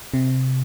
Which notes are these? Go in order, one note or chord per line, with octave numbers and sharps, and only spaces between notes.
C3